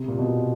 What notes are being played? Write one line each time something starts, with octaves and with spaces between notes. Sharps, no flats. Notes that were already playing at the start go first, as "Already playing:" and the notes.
Already playing: C3
A#2
B2